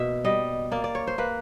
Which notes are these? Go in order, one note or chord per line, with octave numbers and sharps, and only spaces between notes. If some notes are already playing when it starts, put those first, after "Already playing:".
Already playing: B2 A#3 E5
G3 D#5
A#3 D5
D5
C#5
C5
A#3 B4